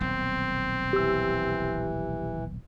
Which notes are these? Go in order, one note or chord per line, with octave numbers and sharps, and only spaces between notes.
D#1 B1 C4
E3 G4 E6